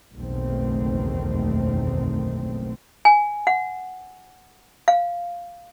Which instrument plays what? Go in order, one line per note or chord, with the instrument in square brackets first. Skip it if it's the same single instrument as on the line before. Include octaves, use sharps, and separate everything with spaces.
[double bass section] F#1 B1 E2 D#3 A3 C4
[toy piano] G#5
F#5
F5